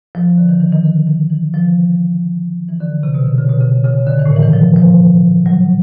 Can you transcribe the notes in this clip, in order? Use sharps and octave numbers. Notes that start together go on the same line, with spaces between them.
F3
D3
D#3
D#3
D#3
D3
D#3
E3
F3
E3
D3
C3
B2
D3
C#3
B2
C#3
C#3
D3
D#3
A2
A#2
E3
D#3
F3
F3
F#3